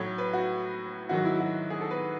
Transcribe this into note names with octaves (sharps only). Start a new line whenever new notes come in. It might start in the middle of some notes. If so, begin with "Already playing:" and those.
Already playing: A2 F#3 C#5
B4
F#4
G#2 D#3 F#3 F#4
E4
F#4
G#4
A4
B4